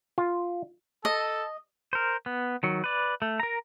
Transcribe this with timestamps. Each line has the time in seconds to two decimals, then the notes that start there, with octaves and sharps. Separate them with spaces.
0.18 F4
1.05 A4 D#5
1.93 A#4 C5
2.26 B3
2.63 D#3 F#3
2.84 B4 D5
3.22 A3
3.40 A#4 A#5